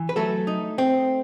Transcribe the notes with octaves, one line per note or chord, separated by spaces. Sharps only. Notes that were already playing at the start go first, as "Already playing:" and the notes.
Already playing: E3
B4
F#3 A3 A4
D#4
C4